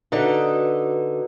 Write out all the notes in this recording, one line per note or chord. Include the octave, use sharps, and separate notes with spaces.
D3 D#4 F#4 B4